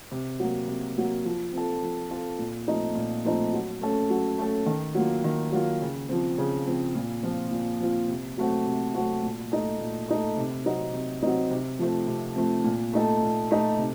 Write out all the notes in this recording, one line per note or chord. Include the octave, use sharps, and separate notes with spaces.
C3
F#3 A#3
C3
F#3 A#3
F3
C4 F4 A4
F3
C4 F4 A4
A#2
F3 A3 C4 D#4
A#2
F3 A3 C4 D#4
F#3
A3 C#4 A4
F#3
A3 C#4 A4
D#3
F#3 A#3 F4
D#3
F#3 A#3 F4
C#3
F3 C4
C#3
F3 C4
A#2
F3 C4 F4
A#2
F3 C4 F4
C3
F#3 A3 C4 F#4
C3
F#3 A3 C4 F#4
A#2
A3 D#4 A4
A#2
A3 D#4 A4
C3
F#3 C4 D#4
C3
F#3 C4 D#4
C3
F3 A3 C4
C3
F3 A3 C4
A#2
A3 D#4 A4
A#2
A3 D#4 A4
C3